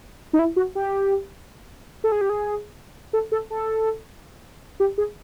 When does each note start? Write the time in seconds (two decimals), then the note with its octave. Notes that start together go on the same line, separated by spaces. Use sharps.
0.33 D#4
0.39 E4
0.56 F#4
0.75 G4
2.04 A4
2.12 G#4
2.21 G4
2.30 G#4
3.13 A4
3.32 A4
3.50 A4
4.80 G4
4.98 G#4